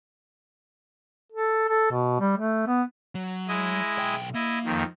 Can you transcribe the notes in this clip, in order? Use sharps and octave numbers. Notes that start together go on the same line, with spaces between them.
A4
A4
B2
G3
A3
B3
F#3
G#3 E4 D#5
B1 G5
A#3 E4 D#5
F2 D#3